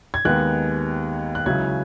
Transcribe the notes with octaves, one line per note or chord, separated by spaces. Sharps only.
G#6
D#2 D#3 G#3 B3 F#6
F#6
C#2 C#3 F#3 C#4 E4 G#6